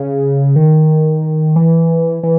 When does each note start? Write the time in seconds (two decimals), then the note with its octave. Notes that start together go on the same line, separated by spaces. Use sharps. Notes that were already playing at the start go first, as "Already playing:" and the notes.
Already playing: C#3
0.56 D#3
1.56 E3
2.23 E3